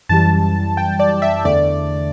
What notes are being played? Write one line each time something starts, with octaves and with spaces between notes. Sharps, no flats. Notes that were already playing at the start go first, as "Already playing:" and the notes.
F#2 E3 G3 A5
G5
D5
E5
E2 D3 A3 D5